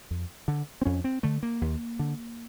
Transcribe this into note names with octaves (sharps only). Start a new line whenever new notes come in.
F2
D3
C4
F2 C#4
C4
D3 A3
A#3
D#2
D3